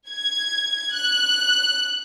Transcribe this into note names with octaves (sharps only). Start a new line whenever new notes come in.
G#6
F#6